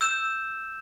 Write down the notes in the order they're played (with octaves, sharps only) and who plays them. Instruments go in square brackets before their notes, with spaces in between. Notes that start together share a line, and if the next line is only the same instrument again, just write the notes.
[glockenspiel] E6 G6 E7